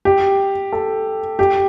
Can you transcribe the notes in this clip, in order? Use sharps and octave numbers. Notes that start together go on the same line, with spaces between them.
G4
A4
G4